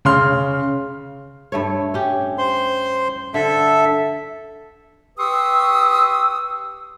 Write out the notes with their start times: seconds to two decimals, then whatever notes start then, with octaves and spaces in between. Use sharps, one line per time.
0.05 C#3 C6 F6
1.52 G2 A3 C#5
1.94 C#4 G4
2.38 C5 C6
3.34 D3 A4 E5
5.18 G4 B4 C6 C#6 D#6 E6